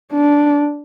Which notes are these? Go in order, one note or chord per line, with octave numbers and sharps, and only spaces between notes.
D4